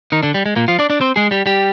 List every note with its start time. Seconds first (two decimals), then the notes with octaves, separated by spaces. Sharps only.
0.12 D#3 D#4
0.23 D3 D4
0.34 G3
0.46 G#3
0.56 A#2 A#3
0.68 F3 F4
0.79 D4 D5
0.90 D4 D5
1.01 C4 C5
1.16 G#3 G#4
1.31 G3 G4
1.46 G3 G4